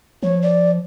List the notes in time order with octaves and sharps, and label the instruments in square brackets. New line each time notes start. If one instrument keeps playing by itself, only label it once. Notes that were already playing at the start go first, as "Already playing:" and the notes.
[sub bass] F3 [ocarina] C#5
[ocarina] D5